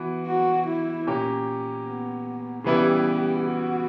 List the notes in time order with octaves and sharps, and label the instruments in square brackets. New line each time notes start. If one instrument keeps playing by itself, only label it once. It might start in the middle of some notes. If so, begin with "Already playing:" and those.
Already playing: [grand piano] E3 B3 F#4
[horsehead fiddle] F#4
E4
[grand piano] A#2 A#3 C#4 G4
[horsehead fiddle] B3
[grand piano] C#3 E3 G3 B3 E4 [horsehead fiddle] G4
[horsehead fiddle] F#4